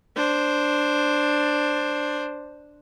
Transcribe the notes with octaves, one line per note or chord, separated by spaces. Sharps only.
D4 C5